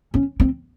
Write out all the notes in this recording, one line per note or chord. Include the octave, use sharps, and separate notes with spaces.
C#4
C4